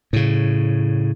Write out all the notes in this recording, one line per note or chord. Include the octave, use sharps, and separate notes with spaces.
A2 C#3